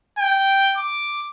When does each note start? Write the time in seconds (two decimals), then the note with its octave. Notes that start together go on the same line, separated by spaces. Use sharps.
0.18 G5
0.77 D6